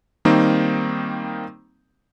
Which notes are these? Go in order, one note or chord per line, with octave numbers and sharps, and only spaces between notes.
D#3 G3 A#3 C4 D#4